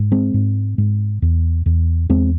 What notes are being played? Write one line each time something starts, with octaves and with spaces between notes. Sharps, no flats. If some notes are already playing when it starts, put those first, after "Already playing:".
Already playing: G#2
G#3 C4
G#2
G#2
E2
E2
E2 G#3 C4